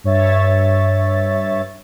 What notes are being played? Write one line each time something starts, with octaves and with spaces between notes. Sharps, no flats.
G2 C#5 E5 A6